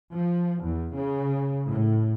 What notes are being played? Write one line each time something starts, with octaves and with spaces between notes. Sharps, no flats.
F3
E2
C#3
A2